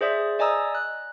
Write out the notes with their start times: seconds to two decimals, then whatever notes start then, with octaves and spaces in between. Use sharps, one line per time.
0.01 G#4 C5 D5 E5 D#6
0.39 D5 D#5 G#5 A#5 D#6 E6
0.75 F#6